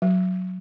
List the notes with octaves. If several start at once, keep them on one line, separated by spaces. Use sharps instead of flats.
F#3